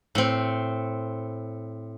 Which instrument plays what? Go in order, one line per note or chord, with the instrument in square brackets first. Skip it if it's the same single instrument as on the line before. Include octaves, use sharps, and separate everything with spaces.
[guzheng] A2 C4